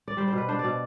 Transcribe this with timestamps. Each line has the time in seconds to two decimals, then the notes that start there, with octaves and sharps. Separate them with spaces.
0.08 D5
0.17 G3 C5
0.28 C5
0.33 B2 B4
0.48 D4 C5
0.59 D5
0.65 B2